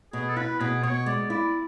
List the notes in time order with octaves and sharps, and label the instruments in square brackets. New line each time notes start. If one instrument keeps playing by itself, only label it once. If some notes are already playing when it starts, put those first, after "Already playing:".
[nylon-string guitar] B2 [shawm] G#4
[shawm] A4
[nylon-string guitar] E4 [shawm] B4
[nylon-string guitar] B2 [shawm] G#4
[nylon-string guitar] B2 [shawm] C#5
[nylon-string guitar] G#3 [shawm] D5
[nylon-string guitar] E4 [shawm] D5